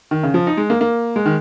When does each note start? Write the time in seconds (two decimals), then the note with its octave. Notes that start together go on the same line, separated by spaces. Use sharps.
0.11 D#3
0.23 C#3
0.34 F3
0.47 D#4
0.57 G#3
0.70 A#3
0.81 A#3
1.16 G#3
1.26 D#3